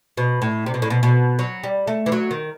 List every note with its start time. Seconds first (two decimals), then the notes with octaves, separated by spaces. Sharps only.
0.17 B2
0.42 A2
0.66 C3
0.74 B2
0.82 A2
0.90 B2
1.03 B2
1.39 F#3
1.63 G3
1.87 A3
2.06 E3
2.12 F#3
2.31 D#3